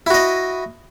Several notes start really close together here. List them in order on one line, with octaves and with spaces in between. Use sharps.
E4 F#4 D#5